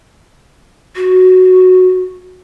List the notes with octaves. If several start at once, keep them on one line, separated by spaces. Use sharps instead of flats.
F#4